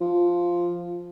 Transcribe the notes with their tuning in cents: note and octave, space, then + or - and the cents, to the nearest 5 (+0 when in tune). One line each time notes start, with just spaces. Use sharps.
F3 +0